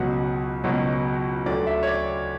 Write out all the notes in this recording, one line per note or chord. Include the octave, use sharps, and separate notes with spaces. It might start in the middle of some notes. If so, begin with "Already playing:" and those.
Already playing: C#2 B2 F#3 F#5
C#2 B2 F#3
D2 D3 F#3 D5
E5
C#5
D5